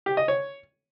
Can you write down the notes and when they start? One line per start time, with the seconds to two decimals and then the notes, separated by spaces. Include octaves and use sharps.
0.06 G4
0.17 D#5
0.28 C#5